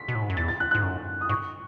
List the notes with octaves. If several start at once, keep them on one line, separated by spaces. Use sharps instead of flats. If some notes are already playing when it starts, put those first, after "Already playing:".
Already playing: B6
B2
A2
G#2
F#2
E2 A6
A6
F#6
G#2 F#6
F#2
D#6
G#2 C#6